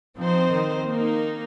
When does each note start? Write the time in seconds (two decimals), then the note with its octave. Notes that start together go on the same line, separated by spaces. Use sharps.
0.17 F3 C4 D#4 C5
0.52 D#3
0.86 A#3 D#4 A#4